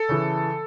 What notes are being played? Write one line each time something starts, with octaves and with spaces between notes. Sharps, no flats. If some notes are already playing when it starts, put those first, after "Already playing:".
Already playing: A4
C#3 E3